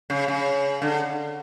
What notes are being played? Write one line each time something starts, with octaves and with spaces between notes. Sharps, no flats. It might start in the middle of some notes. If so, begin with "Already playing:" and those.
C#3
C#3
D3